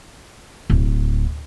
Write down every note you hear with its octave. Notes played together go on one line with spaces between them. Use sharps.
D1